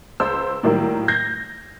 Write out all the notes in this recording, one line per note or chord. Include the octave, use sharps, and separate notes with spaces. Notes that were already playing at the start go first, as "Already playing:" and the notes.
C#2 C5 E6
A2 D#3 F#3 G3 A#3
G6 G#6 A#6 C7